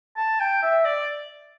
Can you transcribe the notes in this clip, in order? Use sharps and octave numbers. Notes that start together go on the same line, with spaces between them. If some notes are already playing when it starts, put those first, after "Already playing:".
A5
G5
E5
D5